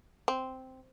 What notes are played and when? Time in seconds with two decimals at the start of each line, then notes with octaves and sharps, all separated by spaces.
0.28 C4